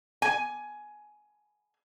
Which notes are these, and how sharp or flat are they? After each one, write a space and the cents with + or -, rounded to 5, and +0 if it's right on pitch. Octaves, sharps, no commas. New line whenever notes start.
G#5 +15